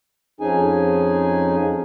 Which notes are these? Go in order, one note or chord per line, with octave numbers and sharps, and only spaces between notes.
F2 F3 C#4 D#4 G#4 G#5